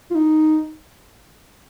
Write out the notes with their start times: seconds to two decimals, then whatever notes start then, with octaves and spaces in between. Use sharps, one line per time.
0.11 F4
0.15 D#4